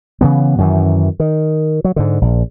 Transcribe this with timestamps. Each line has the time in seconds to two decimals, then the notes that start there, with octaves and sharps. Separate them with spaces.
0.21 C#3 E3 B3
0.58 F#2 D#3 E3
1.20 D#3
1.84 F#3
1.96 G#2 D3
2.21 A#1